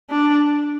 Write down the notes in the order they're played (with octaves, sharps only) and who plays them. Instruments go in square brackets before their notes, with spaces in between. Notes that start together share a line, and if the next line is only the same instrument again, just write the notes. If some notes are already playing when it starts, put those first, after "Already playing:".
[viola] D4